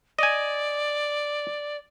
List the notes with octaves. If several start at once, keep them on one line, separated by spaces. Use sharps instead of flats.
D5 D#5 G#5